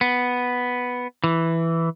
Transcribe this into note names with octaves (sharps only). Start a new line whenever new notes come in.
B3
E3